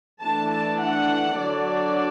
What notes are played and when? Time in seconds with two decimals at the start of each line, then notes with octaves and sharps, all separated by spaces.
0.23 E3 A3 D4 A5
0.53 A5
0.82 F#5
1.40 D3 F#3 D4 D5